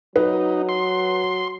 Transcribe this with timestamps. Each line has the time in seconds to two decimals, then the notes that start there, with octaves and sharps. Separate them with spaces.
0.16 F#3 D#4 B4
0.69 C6